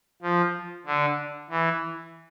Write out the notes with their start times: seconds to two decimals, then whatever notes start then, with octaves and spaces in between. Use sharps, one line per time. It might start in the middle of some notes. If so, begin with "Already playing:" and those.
0.22 F3
0.86 D3
1.50 E3